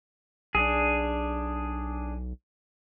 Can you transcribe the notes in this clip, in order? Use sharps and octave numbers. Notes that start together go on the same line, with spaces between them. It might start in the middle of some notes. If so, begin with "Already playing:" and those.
B1 D4 G#4